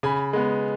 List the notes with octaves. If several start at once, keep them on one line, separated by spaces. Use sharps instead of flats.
C#3 G#5 B5
G#3 B3